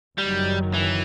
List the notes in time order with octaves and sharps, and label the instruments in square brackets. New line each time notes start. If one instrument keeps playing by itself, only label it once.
[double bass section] F#1 F#2 D#3 F#3 [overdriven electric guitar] G3
[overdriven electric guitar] E3